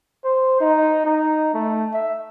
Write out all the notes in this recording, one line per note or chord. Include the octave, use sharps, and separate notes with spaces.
C5
D#4
D#4
A3
E5